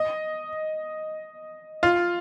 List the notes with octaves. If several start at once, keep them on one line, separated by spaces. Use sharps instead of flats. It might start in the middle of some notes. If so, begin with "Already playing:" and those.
Already playing: D#5
F4